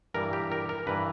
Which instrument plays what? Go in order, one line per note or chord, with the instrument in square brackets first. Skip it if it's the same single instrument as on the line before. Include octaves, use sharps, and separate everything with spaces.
[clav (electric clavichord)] G2 E3 G3 A#4
G4
A#4
A#4
G2 E3 G3 B4